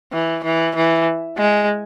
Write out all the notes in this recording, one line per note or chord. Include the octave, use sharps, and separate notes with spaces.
E3
E3
E3
G#3